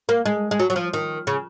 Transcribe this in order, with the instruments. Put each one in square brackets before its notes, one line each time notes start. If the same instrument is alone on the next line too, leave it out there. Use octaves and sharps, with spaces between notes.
[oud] A#3
G#3
G#3
F#3
F#3
F3
D#3
C#3